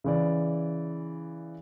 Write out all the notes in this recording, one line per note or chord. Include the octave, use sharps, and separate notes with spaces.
C#3 E3 D5